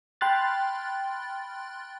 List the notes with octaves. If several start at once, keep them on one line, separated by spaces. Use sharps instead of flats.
G5 B5 C6 F6 F#6 A6